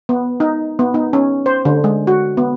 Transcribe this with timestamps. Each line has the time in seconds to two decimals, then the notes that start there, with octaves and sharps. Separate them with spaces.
0.09 B3
0.40 D#4
0.79 B3
0.94 D#4
1.13 C#4
1.46 C5
1.65 D3
1.84 G#3
2.07 F#4
2.37 B3